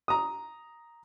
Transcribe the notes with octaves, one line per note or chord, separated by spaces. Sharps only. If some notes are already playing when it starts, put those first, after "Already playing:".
A#5 D#6